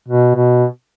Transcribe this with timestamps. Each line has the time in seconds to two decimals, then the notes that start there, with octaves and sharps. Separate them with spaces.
0.08 B2
0.36 B2